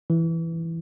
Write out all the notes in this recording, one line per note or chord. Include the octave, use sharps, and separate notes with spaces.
E3